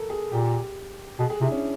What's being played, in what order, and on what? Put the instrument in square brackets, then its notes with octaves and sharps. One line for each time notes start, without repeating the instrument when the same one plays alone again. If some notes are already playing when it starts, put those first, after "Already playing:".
Already playing: [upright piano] A4 A#4
G#4
[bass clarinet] A#2 [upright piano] G4
[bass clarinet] B2 [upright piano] G#4
[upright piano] G#4
[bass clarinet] C3 [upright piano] E4
[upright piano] D4
C#4